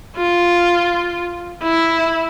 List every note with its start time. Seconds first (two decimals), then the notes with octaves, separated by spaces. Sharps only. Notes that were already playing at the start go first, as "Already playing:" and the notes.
0.17 F4
1.63 E4